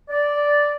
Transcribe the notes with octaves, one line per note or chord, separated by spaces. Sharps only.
D5